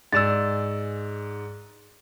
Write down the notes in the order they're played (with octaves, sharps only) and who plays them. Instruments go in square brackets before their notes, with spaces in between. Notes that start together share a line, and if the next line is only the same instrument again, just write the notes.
[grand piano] G#2 D5 E7 [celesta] E6 A6